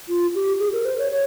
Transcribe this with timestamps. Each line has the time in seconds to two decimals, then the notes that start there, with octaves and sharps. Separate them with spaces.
0.09 F4
0.35 G4
0.59 G#4
0.73 A#4
0.85 C5
0.99 C#5
1.11 C#5